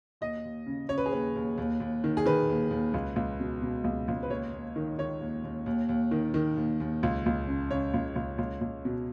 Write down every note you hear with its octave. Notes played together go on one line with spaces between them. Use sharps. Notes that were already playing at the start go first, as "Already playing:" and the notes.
D#2 D#5
D#2
C#3
C#3 C#5
B4
G#4
D#2 B4
D#2
D#2
D#2
D#3
G#4
D#3 B4
D#2
D#2
C#2
C#2
B2
B2
C#2
C#2
B4
D#2 C#5
D#2
D#3
D#3 C#5
D#2
D#2
D#2
D#2
D#3
D#3
D#2
D#2
C#2
C#2
C#3
C#3 C#5
C#2
C#2
C#2
C#2
B2